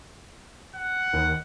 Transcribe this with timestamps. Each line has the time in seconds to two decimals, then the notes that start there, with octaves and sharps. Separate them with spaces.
0.76 F#5
1.13 D#2